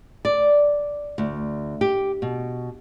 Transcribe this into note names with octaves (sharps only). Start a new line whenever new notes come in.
D5
D2
G4
B2